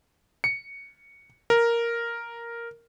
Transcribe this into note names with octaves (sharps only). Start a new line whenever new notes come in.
C#7
A#4